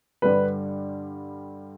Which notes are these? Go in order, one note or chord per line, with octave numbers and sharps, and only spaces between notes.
G2 D3 G3 B4